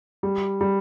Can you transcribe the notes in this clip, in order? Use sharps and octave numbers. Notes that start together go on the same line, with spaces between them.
G3
G3